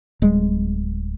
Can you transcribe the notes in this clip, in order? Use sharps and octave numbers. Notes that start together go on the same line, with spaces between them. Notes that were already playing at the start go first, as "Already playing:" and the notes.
D1 G3 G#3